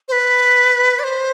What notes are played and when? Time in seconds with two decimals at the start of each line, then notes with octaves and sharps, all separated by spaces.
0.08 C5
0.12 B4
0.99 D5
1.04 C5